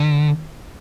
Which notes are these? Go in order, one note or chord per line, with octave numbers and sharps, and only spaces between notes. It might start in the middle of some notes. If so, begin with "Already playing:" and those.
Already playing: D3